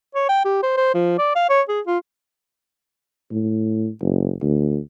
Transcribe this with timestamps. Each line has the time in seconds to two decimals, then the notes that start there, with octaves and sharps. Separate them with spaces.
0.15 C#5
0.29 G5
0.45 G4
0.63 C5
0.77 C5
0.94 F3
1.18 D5
1.35 F5
1.49 C#5
1.69 G#4
1.87 F4
3.31 A2
4.01 F#1
4.42 D2